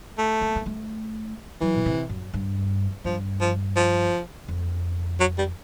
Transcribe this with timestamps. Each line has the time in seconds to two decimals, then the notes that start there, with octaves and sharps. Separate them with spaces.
0.18 A3
0.41 A#3
0.56 A#3
0.66 A3
1.61 E3 F#3
1.74 B2
1.86 C3
2.09 F#2
2.34 G2
3.05 G2 F3
3.41 F3
3.76 F3
4.48 F2
5.20 F#3
5.38 G3